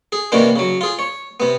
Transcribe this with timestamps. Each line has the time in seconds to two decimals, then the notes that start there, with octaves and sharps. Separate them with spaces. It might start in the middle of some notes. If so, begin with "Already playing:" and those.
0.12 G#4
0.32 C3 D#3 E3 A#3 C#4 D4
0.56 C#3 F#3
0.81 F4 G#4
0.99 C#5
1.40 C3 B3